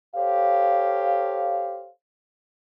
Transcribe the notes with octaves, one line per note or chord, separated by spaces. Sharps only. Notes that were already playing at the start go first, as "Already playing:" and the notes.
G4 A4 C5 C#5 F5